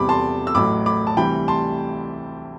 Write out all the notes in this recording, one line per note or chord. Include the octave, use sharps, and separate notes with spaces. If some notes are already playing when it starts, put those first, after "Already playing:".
Already playing: E2 C3 G3 B5 D6
A5 C6
E6
A1 A2 F#3 B5 D6
B5 D6
A5
D2 C3 E3 G3 G5 B5
A5 C6